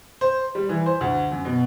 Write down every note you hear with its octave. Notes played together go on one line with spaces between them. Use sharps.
C5
G3
E3
C5
D2
F#2
B2